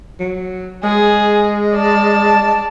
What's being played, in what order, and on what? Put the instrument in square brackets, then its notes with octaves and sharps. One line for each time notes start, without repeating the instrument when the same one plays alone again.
[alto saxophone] F#3
[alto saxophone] G#3 [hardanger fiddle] G#4
[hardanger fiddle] D5 A5